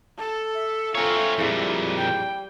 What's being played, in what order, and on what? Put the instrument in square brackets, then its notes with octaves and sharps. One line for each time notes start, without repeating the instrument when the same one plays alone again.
[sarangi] A4 [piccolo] A5
[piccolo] E5
[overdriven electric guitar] C4 C#5 [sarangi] F4 [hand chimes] A4 G#5 A#5
[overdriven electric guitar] F2 A#2 [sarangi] G3 [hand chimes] E4 G#4 F5
[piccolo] G5